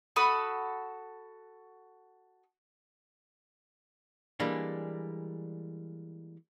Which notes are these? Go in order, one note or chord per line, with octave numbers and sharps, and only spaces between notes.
F#4 A4 B5 D#6
E3 G3 G#3 A#3 D4